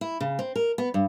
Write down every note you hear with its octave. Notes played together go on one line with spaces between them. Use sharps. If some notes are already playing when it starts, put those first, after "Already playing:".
E4
C#3
C4
A#4
B3
G2